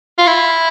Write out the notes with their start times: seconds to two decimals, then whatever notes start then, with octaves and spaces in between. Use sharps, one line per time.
0.18 F4
0.27 E4